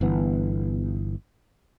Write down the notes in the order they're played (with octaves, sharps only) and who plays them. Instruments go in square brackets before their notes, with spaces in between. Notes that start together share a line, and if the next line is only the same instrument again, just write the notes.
[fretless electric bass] G1 E3 B3